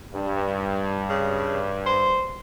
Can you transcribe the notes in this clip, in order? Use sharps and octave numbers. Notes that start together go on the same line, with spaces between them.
G2
C#3
C5